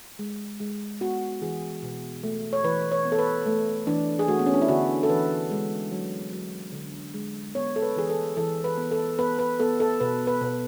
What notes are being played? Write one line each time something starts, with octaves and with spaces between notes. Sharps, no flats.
G#3
G#3
B3 F#4
E3 G#4
B2
A3
C#5
E3 B4
C#5
B3
A4
B4
A3
E3 D4
G#4
A3 F#4
B3
C#4
D4
E4
D3 F#4
A4
E3 B4
G#3
F#3
F#3
D3
G#3
B3 C#5
A4
B4
E3 G#4
A4
E3 A4
B4
B3
A4
B3 B4
B4
B3 A4
A4
B2 B4
B4
B2